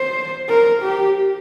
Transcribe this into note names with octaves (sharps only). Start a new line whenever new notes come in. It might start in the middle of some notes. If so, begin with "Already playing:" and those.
Already playing: C5
A#4
G4